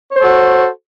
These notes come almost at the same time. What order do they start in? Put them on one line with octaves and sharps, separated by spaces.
C#5 C5 A4 F#4